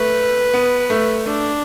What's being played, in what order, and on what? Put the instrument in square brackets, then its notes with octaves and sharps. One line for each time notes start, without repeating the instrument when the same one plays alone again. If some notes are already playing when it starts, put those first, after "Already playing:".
Already playing: [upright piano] A3 [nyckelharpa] B4
[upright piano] B3
A3
[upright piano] A3 [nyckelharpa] D4